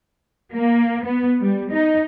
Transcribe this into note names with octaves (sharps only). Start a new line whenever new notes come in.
A#3
B3
G3
D#4